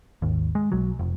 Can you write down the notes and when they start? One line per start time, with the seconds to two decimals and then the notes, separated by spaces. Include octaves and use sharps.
0.22 G#1 D#2
0.55 G#3
0.72 B1 F#3
0.99 F1